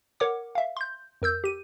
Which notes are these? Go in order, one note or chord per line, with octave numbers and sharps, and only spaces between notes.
A#4 C#5 F#5 D6
E5 F5
C6 G6
F2 A#4 E6 G6
G4 D#7